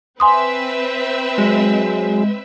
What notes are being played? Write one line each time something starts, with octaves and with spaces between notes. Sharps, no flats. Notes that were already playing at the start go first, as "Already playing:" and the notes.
C4 B4 E5 G#5 C6 D#6
F#3 G#3 G#4